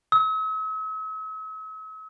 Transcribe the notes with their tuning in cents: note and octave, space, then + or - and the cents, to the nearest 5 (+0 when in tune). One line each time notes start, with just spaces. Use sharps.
E6 -45